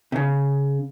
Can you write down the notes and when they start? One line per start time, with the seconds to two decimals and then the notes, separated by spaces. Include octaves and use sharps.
0.12 C3
0.16 C#3